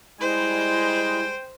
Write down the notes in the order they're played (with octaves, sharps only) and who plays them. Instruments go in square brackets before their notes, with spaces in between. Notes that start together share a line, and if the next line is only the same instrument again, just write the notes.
[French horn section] G3 G#3 [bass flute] E4 [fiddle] C5 [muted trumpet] G5